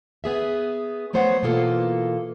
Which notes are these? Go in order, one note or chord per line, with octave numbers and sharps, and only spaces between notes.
B3 G#4 E5
F#3 A3 B3 C5 C#5 F#5
B2 E3 A#3 F4 A4